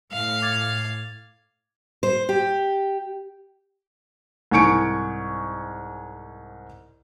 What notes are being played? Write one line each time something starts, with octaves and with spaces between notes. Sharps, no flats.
A2 F5
D6 G#6 A6
C5
G4
C2 G#2 G#5 C#6 C#7 D7